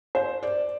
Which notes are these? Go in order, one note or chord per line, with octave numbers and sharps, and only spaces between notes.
C5
D5